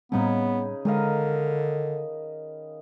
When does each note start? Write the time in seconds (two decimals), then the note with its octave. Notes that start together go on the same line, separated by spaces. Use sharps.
0.12 A2 C#3 G3 B3 C4 D#4 B5
0.85 D3 D#3 G#3 D#5 F5